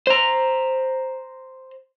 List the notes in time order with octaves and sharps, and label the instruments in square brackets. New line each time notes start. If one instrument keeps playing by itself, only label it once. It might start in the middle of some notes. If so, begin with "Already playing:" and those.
[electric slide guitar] C5 A#5